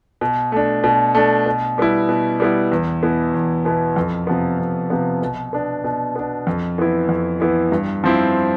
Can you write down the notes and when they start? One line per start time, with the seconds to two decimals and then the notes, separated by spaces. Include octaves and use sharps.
0.21 B2
0.52 A3 D4
0.84 B2
1.15 A3 D4
1.46 B2
1.78 G3 B3 E4
2.09 B2
2.40 G3 B3 E4
2.72 E2
3.02 B2 B3 E4
3.34 E2
3.65 B2 B3 E4
3.96 F2
4.27 C3 F3 B3
4.59 F2
4.90 C3 F3 B3
5.22 B2
5.53 B3 D4
5.84 B2
6.16 B3 D4
6.47 F2
6.78 E3 B3 E4
7.09 F2
7.40 E3 B3 E4
7.72 G2
8.04 F3 C4 E4